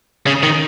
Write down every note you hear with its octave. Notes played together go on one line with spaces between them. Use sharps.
C#3
D#3